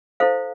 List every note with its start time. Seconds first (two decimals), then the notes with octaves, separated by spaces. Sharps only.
0.20 E4 A4 C5 F5